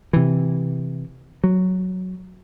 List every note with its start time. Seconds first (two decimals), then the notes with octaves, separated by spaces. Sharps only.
0.13 C3 E3
1.44 F#3